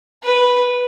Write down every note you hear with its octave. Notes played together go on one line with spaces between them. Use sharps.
B4